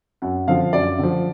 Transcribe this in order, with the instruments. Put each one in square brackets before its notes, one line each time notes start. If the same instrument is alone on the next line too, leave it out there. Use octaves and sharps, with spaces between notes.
[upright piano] F#2 F#5
D3 F3 F5
F#2 D5
D3 F3